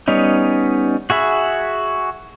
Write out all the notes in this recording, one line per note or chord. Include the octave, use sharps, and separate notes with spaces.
G3 B3 C#4 D#4
F#4 G#4 E5 B5